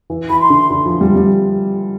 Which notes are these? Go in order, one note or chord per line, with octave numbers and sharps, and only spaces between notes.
E3
E3 B5
C6
D3
D3
F3
G3
G3